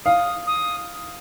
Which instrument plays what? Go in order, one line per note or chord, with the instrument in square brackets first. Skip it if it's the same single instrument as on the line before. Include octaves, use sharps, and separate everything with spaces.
[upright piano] F5 [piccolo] D#6
[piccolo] D#6